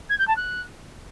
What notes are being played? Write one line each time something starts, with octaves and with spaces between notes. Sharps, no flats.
G#6
G6
A5
F#6